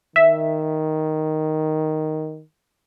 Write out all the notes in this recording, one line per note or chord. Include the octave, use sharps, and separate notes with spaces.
D#3 E5